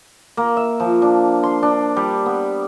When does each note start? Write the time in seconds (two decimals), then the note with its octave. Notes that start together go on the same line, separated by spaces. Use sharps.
0.37 A#3
0.57 E5
0.80 F3
1.02 D4
1.43 C6
1.63 D4
1.97 G3
2.26 B3